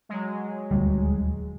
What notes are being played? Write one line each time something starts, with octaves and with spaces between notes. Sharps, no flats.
F#3 G#3
D#1 D2 G3